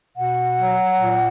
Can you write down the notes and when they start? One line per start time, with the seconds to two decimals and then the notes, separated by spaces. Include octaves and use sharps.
0.16 B2 F#5
0.57 F#3
0.98 A#2